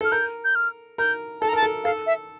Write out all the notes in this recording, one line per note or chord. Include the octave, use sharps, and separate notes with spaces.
A4 F6
A#4 G6
G6
F6
A#4 G6
A4 A5
A#5
A#4 A5
A4
A4 F5
E5